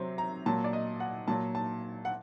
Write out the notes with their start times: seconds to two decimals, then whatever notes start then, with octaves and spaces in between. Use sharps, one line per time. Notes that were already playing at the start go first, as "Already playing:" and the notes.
Already playing: C3 F#3 C5
0.18 A#5
0.46 A#2 F#3 A5
0.64 D5
0.73 D#5
1.00 F#5
1.28 A#2 F#3 A5
1.55 A5
2.05 F#5